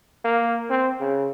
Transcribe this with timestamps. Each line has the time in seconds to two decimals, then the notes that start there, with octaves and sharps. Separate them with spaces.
0.25 A#3
0.70 C4
1.00 C#3